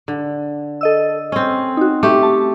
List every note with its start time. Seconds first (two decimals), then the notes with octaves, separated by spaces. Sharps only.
0.08 D3
0.81 A4 D#5 E6
1.32 C4 C#4
1.77 D#4 F#4
2.03 A3 G4
2.23 A5